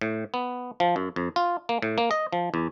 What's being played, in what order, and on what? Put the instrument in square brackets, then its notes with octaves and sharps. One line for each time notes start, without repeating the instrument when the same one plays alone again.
[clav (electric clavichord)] A2
B3
F3
F#2
F2
F4
A#3
A2
A#3
D#5
F3
E2